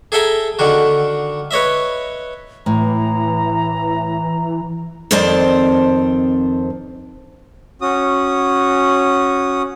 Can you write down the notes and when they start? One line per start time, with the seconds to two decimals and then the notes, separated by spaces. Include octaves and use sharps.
0.12 G#4 A4 E5 G5 G#5 A#5
0.59 D3 D#3 F#4
1.51 B4 C#5 D#5 E5
2.66 A2 E3 A#5
5.11 F2 D#3 C4 C5 D5 A5
7.81 C#4 F#4 D#6